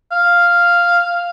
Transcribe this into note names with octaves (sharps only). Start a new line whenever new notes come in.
F5